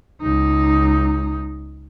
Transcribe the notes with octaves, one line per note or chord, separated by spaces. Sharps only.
C#2 D#4